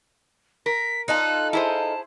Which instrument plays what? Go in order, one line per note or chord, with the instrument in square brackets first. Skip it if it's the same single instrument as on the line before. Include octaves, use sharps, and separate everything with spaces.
[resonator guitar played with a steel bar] A#4 [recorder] B6
[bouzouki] D#4 F4 A4 [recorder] F#6
[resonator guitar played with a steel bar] E4 G#4 C5 [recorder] A5